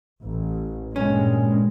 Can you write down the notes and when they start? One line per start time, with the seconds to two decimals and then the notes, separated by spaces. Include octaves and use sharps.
0.23 A1
0.96 G2 A#2 G#3 C#4